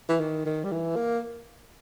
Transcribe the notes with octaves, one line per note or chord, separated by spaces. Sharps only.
E3
D#3
D#3
G3
E3
A#3